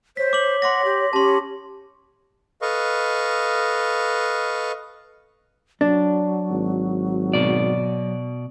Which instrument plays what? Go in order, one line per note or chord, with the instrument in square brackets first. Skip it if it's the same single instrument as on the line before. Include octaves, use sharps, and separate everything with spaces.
[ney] C5 [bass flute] C#5 [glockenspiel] B6
[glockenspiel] D6 F#7
[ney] F#5 [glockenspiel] C6 D6 A#6
[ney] G4
[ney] C#4 [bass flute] G4 [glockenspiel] A5 C6
[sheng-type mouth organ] A4 B4 D#5 F5 C#6
[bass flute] F#3 [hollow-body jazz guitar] D4
[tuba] G#1
[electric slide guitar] B2 D5